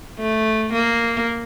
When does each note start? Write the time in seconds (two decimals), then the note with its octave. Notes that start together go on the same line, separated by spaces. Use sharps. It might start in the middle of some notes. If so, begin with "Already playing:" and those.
0.19 A3
0.73 A#3